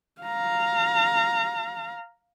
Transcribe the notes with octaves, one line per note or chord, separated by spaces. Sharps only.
F5 A#5